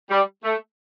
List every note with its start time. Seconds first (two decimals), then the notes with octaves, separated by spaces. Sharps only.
0.10 G3
0.44 A3